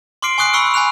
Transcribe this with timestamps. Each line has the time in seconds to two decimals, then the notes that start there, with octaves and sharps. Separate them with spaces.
0.22 C6 D6 F6 C7 D7
0.38 G#5 C#6 D#6 F#6 C7 D7
0.53 B5 C#6 E6 F#6 C#7
0.74 G#5 B5 F#6 F7